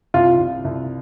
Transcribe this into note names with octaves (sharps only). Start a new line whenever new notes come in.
C2 F4
C2
C2